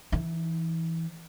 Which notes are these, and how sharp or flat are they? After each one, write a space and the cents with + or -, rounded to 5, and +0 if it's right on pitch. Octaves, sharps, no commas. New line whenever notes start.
E3 +0 D#4 +35